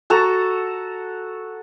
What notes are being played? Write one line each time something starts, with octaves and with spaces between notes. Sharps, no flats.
F#4 A4 A5 A#5